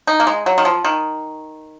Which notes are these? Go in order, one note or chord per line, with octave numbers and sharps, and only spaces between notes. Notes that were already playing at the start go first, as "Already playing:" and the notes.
D#4
A#3
G#3
F#3
D#3
F3
D#3